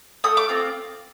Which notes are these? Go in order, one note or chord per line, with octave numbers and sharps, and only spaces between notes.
A3 D#6
D6
C4 F4